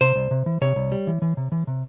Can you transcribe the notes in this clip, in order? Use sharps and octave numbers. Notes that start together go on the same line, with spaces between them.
C3 C5
C2
C3
E3
C3 C#5
C2
G3
E3
E3
C3
E3
C3